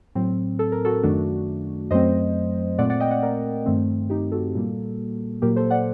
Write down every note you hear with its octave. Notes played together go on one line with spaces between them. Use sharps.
A2 F#3 C4
A4
A#4
F#4 A4
F#2 D#3 A3 D4 F#4
F#2 F#3 A3 C4 C5 D#5
A#2 A3 C4 D5 F#5
D5 F#5
D#5 G5
D5 F#5
A#4 D5
G2 D#3 A3 C4
D#4 G4
F#4 A4
A#2 G3 A#3
A#2 F#3 A#3 G4 A#4
A4 C5
D5 F#5